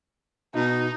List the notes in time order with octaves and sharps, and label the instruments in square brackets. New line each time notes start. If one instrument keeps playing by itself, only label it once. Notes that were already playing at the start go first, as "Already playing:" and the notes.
[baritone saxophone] B2 [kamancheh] D#4